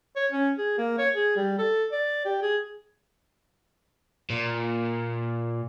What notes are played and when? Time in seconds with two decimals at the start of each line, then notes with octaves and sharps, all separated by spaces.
0.16 C#5
0.31 C#4
0.58 G#4
0.78 A#3
0.98 C#5
1.15 G#4
1.36 G3
1.58 A4
1.92 D5
2.25 G4
2.42 G#4
4.30 A#2